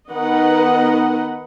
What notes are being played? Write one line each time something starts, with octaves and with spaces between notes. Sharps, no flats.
D#3 B3 A#4 B4 D#5 F#5